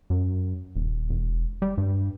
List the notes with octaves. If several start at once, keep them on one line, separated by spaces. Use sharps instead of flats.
F#2
D#1
E1
G3
G2